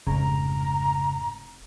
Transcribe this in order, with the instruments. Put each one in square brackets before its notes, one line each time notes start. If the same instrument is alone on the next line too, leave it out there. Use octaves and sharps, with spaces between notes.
[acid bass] F1 [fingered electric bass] F2 G#2 [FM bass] C#3 [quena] A#5